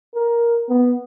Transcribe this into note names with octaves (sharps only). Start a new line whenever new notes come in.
A#4
B3